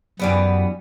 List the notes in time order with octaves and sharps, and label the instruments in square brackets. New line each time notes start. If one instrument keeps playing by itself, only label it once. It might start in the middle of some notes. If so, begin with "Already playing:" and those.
[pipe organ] F#2 [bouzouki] E3 G3 B3